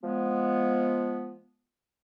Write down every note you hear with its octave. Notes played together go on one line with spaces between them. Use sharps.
F3 G#3 B3